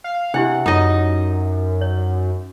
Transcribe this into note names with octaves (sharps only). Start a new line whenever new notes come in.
F5
C3 D4 E4 G4 F#5
F#2 D#4 F4 C#5 D#5 F#5
C#5